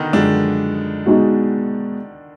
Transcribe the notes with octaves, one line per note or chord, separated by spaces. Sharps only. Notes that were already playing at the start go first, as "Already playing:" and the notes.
Already playing: B2 D3 D#3 B3 D4 D#4
F#2 D3 F3 G#3 D4
B2 G#3 D#4 F#4